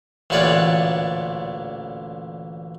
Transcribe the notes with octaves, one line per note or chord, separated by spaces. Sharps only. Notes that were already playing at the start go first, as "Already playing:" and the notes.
A1 D2 A#2 B4 C#5 D5